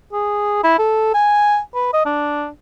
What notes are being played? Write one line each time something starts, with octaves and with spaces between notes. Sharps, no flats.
G#4
E4
A4
G#5
B4
D#5
D4